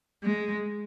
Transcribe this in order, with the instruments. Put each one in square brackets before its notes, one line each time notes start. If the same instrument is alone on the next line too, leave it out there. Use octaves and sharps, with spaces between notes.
[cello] G#3